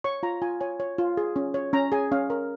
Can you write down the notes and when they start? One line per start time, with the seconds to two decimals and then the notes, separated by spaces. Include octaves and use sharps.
0.04 C#5 C#6
0.23 F4 A#5
0.42 F4 G#5
0.61 C#5 G#5
0.80 C#5
0.98 F4
1.17 G#4
1.36 C#4
1.54 C#5
1.73 C#4 A#5
1.92 G#4 G#5
2.12 C#4 F5
2.30 A#4